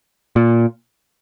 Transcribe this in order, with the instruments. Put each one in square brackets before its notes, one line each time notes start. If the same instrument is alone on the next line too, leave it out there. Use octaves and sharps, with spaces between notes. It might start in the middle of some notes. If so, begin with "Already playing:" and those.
[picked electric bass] A#2